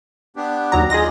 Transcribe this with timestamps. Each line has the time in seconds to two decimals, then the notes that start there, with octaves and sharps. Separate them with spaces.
0.36 B3 D4 G4
0.72 D#2 F#3 A#5
0.90 F4 G4 G#4 D#5 A#6